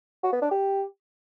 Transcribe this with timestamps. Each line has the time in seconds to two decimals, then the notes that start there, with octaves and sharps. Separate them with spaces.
0.23 F#4
0.33 B3
0.42 D4
0.51 G4